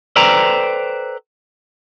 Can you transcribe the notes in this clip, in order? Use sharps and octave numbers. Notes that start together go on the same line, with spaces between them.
A4 B4 C5 D5 G5 A#5